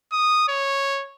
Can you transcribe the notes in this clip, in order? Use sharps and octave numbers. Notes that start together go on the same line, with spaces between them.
D#6
C#5